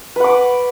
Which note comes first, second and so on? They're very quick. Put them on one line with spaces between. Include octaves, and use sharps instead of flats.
B4 F#5 D6